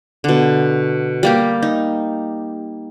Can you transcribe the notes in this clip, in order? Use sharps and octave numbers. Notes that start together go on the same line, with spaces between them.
B2 D3
G3 A#3 G4
D#4